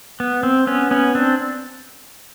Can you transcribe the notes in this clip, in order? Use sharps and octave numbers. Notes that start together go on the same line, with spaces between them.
B3
C4
B3 C#4
B3 C#4
C4 D4